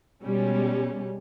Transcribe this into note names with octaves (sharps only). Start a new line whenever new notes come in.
B2 G3 G#3 C#4